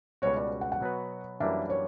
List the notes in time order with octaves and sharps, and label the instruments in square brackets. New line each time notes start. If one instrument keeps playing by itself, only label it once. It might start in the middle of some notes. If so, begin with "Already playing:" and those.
[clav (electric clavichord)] C#2 B2 G3 C#4 F#4 [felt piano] C#5
[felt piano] D5
F#5
F#5
[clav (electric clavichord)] B2 F#3 B3 F#4 B4
[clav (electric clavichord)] F#2 E3 G3 A#3 D4 [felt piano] E5
[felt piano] C#5